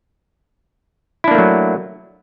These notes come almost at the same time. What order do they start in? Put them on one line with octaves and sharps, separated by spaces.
E4 D4 A#3 A3 F#3